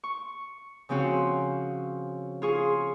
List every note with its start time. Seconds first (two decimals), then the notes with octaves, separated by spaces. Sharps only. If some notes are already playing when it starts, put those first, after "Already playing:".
0.04 C#6
0.89 C#3 F3 C4 C#4 F#4
2.42 F4 G#4 C#6